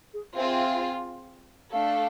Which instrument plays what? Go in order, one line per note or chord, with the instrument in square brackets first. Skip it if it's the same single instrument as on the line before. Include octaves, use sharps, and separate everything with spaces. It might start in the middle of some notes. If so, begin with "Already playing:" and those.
[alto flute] G#4
[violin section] C4 F4 G#4 [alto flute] E5
[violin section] A3 D4 A4 [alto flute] F5